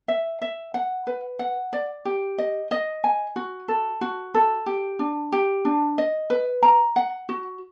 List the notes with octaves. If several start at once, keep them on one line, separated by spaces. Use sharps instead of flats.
E5
E5
F#5
B4
F#5
D5
G4
D#5
D#5
G#5
F#4
A4
F#4
A4
G4
D4
G4
D4
D#5
B4
A#5
F#5
F#4